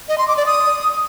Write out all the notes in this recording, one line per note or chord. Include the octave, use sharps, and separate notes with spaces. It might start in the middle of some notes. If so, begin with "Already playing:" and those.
D#5
C6
D6
D5
D#6